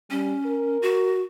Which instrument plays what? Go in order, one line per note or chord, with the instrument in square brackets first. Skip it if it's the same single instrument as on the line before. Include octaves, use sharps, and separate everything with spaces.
[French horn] G3 [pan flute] C#4
[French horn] A#4
[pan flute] F#4